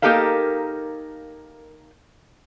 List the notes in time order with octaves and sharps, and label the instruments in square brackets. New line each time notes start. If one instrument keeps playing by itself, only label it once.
[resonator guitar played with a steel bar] A#3 D#4 G4 A4 A#4 F5